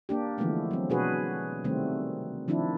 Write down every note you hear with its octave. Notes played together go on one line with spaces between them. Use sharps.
A#3 D4 G4
D3 E3 F3 G#3 A3 B3
F#3 C4
B2 D4 F#4 G#4 B4
C3 D#3 G3 A3 C4
D#3 F3 C4 D4 E4